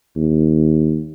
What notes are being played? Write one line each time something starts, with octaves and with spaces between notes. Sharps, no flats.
D#2